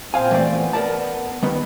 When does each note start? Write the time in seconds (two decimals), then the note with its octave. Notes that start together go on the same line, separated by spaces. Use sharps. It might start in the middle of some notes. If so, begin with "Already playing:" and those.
0.14 A#2 C4 C5 F5 G#5
0.31 E3 A3 D5
0.53 B3
0.73 A#4 D5 A5
1.42 D#3 G3 B3